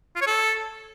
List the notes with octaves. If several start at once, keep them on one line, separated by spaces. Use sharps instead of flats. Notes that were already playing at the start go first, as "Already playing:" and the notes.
F4
C#5
A4